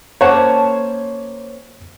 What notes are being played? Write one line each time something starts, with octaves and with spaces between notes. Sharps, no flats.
A#3 C#4 C5 C#5 F#5 A5